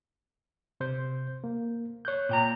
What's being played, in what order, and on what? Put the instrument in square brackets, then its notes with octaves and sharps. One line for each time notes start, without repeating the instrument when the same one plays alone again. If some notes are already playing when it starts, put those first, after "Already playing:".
[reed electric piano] C3 C5 G6
A#3
C#5 F#6 G6
[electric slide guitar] A#2 G5 A#5